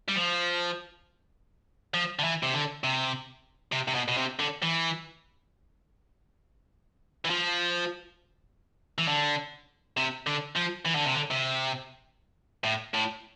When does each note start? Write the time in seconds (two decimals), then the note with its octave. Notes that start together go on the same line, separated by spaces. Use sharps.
0.09 G3
0.16 F3
1.94 F3
2.19 D3
2.24 E3
2.43 C3
2.54 D3
2.84 C3
3.72 C3
3.88 C3
3.95 B2
4.08 B2
4.17 C3
4.39 D3
4.62 E3
7.25 E3
7.30 F3
8.98 E3
9.08 D3
9.97 C3
10.27 D3
10.56 F3
10.86 E3
10.96 D3
11.06 C3
11.15 D3
11.31 C3
12.64 A2
12.94 A2